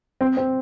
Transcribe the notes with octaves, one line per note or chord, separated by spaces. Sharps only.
C4
C4